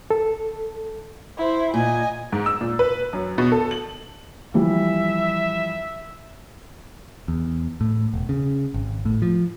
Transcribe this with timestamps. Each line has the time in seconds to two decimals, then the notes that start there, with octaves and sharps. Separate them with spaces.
0.11 A4
1.38 E4 C5
1.74 A#2 D#5 G#5
2.32 G#2
2.46 E6
2.61 A#2
2.79 B4
3.13 F#2
3.38 B2
3.52 A4
3.71 F#7
4.54 E3 F3 G3 E5
7.28 E2
7.81 A2
8.13 E1
8.29 C#3
8.74 G#1
9.05 A2
9.22 F3